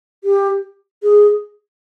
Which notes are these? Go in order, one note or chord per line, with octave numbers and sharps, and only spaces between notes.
G4
G#4